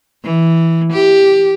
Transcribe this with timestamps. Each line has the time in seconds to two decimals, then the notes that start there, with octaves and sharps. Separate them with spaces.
0.24 E3
0.93 G4